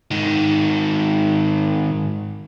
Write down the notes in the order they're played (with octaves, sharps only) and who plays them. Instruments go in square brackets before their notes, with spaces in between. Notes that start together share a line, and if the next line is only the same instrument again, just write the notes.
[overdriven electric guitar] G#2 D#3